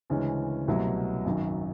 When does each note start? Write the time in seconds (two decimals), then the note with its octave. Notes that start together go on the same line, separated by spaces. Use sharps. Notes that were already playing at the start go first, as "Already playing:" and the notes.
0.10 D2 C#3 E3 G#3 C#4
0.68 C2 B2 F#3 A3
1.25 G#1 F#2 D#3